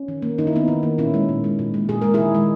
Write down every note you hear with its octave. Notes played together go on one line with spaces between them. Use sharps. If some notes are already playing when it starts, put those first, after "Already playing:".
Already playing: C#4
D#3
A#3
D#3 D#4
E4
A#3 B3 D#4
D#3
A#3
A#2 C#4 E4
G#3
A#2
G#3
A#2
G#3
A#2 G#4
G#3 A#4
D#3 E4 G#4
G#3